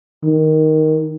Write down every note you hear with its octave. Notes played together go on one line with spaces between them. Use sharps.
D#3